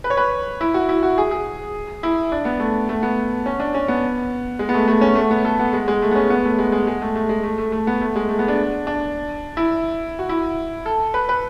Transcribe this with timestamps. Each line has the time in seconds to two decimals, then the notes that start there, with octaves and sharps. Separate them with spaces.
0.04 B4
0.10 C#5
0.17 B4
0.61 E4
0.74 F#4
0.89 E4
1.03 F#4
1.18 G#4
1.31 G#4
2.03 E4
2.32 D4
2.45 B3
2.60 A3
2.89 A3
3.03 B3
3.46 C#4
3.60 D4
3.74 C#4
3.88 B3
4.59 G#3
4.69 B3
4.74 A3
4.88 A3
5.01 C#4
5.16 A3
5.31 B3
5.45 A4
5.60 B3
5.73 G#3
5.88 G#3
6.02 A3
6.11 B3
6.16 C#4
6.30 B3
6.45 A3
6.59 G#3
6.72 G#3
6.87 G#3
7.02 A3
7.16 A3
7.29 G#3
7.43 A3
7.58 A3
7.72 A3
7.87 B3
8.01 A3
8.16 G#3
8.29 A3
8.39 B3
8.48 D4
8.87 D4
9.57 E4
10.19 F#4
10.29 E4
10.86 A4
11.14 B4
11.29 B4